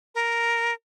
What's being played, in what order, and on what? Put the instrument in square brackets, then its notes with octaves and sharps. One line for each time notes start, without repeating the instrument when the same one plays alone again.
[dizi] A#4